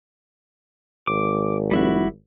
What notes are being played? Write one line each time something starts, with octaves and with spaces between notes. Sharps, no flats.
G#1 D6
F1 G3 E4 F#4